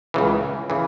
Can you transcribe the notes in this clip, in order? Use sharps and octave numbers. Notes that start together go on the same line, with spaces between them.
C#2 C#3 E3
C#3 E3